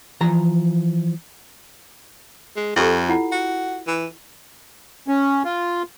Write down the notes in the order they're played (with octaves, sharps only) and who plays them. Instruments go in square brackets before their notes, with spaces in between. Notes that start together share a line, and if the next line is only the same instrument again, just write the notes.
[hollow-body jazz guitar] E3 F3 A#5
[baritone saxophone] G#3
[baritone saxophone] F2 [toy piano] F4 G4 A4
[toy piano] E4 F4 F#5
[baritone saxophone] F#4
E3
[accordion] C#4
F4